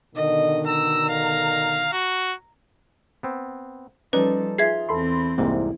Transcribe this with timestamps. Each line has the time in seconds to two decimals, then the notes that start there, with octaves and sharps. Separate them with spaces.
0.15 B2 D3 D#3 D#5
0.67 A#5 E6
1.10 F5
1.93 F#4
3.23 B3 C4
4.13 F3 G3 C#4 D#4 A4 B4 D5
4.58 F4 G#4 E5 G#6 C7
4.89 E2 C4 A4 B5 C6
5.38 C2 G#2 C3 A#3 E4